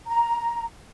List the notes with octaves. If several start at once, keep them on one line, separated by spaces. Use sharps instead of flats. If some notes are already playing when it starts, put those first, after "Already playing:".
A#5